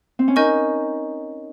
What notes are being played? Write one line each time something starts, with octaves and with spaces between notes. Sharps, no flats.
C4
C#4
D#4 A#4 D#5 G#5 C#6 G6